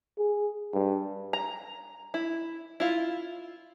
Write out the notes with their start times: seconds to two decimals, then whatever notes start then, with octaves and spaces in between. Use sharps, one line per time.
0.18 G#4
0.73 G2
1.33 A#5
2.14 E4
2.80 E4 F4